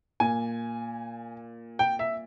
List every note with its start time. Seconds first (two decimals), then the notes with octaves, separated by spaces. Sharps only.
0.20 A#2 G#5
1.79 G5
1.99 E5